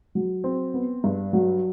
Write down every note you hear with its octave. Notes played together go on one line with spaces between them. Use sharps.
F#3
C4
B3
G2
F#3